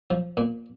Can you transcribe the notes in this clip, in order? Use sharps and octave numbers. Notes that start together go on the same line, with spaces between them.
F3
A#2